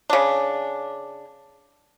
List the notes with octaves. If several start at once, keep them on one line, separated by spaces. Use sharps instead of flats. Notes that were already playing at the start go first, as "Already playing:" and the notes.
C#3 D4